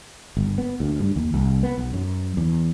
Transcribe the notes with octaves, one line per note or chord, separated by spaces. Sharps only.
G1
B3
D2
G2
D#2
C2
B3
B1
F#2
E2